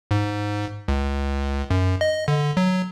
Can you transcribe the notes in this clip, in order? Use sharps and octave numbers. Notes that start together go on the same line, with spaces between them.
G#2
C#2
F#2
D#5
D3
F#3